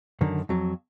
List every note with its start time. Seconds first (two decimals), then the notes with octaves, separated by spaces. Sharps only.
0.21 F#2 D3 D#3
0.49 F2 F#3